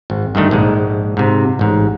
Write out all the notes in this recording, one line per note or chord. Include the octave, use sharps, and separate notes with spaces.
G#1
G2 D3 D#3 A3
A#1 G#2 G#3
G#2 C3
A1 G#2